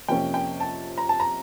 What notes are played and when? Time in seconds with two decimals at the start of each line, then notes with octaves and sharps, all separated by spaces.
0.08 F2 C3 F3 A#3 C#4 G5
0.34 G5
0.60 A5
0.98 A#5
1.09 A5
1.20 A#5